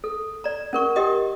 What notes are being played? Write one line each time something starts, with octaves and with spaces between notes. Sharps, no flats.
A4
D5 A#5
C#4 A#4 C#6
G4 A#4 D#5 G5 D#6